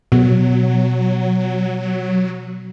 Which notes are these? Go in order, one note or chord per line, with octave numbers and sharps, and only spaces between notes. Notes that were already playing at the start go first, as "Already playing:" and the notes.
B2 F#3